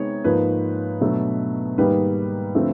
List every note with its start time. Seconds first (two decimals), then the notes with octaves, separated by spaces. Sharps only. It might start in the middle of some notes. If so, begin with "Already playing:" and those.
Already playing: C3 G#3 B3 D#4 C#5
0.24 G#2 F3 A#3 B4
1.01 B2 F#3 A3 D4
1.78 G#2 D#3 G3 A#3 D#4 B4
2.55 D3 F3 A3 C4